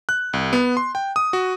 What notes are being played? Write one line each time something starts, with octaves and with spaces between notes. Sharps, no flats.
F#6
C2
B3
C6
G5
D#6
F#4